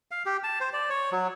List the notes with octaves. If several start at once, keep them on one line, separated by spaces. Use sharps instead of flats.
F5
G4
A5
C5
D5
C#5
F#3